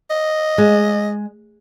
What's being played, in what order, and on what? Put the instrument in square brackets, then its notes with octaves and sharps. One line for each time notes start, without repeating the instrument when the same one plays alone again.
[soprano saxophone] D#5
[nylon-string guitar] G#3